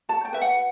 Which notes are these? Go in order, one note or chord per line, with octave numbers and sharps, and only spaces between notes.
F#4 A5
G5
B4 E5
F#5